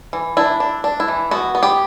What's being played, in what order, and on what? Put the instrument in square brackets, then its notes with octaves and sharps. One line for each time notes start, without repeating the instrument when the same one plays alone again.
[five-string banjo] E3
D4 E4
D4
D4
E4
E3
B3 F#4
B3
G4